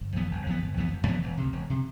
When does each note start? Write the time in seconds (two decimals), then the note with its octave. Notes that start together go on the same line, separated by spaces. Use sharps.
0.01 G1
0.16 F2 E3 B3
0.31 G1
0.47 F2 E3 B3
0.62 G1
0.77 F2 E3 B3
0.93 G1
1.07 F2 E3 B3
1.23 E1
1.37 D2 C3
1.53 E1
1.70 C3